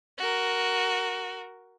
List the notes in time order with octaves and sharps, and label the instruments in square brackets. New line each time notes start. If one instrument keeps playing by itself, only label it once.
[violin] F#4 A#4